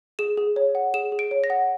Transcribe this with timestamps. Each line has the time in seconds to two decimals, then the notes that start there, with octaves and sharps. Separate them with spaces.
0.19 G#4 E7
0.37 G#4
0.56 C#5
0.75 F#5
0.94 G#4 E7
1.12 G#4
1.19 D7
1.31 C#5
1.44 A#6
1.50 F#5